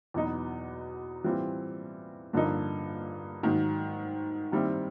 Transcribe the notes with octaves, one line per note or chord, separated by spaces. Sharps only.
E2 B2 F#3 B3 D#4
E3 G3 C4 F4
G2 D3 F3 A#3 D#4
G#2 D#3 F#3
D#3 G3 C4 E4